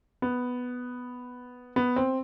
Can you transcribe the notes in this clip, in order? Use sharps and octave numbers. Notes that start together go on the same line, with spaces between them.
B3
B3
C4